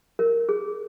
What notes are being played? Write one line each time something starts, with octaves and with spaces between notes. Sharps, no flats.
A#4
G#4